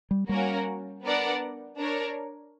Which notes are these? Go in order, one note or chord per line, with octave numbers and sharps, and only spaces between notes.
G3
G3 A#3 C#4 F#4 A#4
B3 D4 A#4 D5 F#5
D4 A#4 C#5